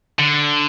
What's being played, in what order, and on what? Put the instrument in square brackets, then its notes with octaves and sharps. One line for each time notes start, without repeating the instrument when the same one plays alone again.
[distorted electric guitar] D3